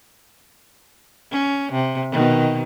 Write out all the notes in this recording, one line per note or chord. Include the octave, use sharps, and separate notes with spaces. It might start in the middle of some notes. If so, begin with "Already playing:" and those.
C#4
C3
B2 D#3